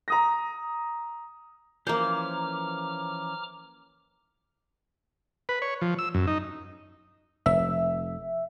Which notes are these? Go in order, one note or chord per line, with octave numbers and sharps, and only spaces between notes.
A#5 D#6 A#6
E3 F3 A#3 C#4 C5 A#5 D6 F6
B4
C#5
F3
E6
F#2
D#4
F1 E5